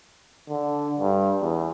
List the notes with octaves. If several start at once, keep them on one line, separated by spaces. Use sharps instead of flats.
D3
G2
E2